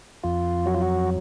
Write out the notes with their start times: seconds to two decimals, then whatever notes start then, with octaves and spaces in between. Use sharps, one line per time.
0.23 F2 F4
0.66 F#3 F#4
0.74 F4
0.82 F#4